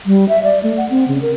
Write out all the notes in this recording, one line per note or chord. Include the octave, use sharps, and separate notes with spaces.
G3
E5
D5
A3
F#5
C4
C#3
A#4